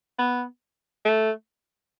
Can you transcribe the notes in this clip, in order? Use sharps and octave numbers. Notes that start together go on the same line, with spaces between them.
B3
A3